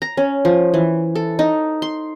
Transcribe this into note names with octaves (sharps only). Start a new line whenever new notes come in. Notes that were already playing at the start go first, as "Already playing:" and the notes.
A#5
C#4
F3
E3
A4
D#4
C6